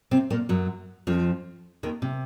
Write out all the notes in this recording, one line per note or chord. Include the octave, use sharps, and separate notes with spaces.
C3 C4
A#2 A#3
F#2 F#3
F2 F3
D#2 D#3
C3